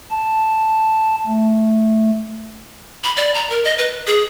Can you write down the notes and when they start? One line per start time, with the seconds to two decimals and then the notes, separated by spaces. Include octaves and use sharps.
0.11 A5
1.26 A3
3.04 B5
3.17 D5
3.34 A#5
3.50 A#4
3.64 D#5
3.78 B4
4.07 G#4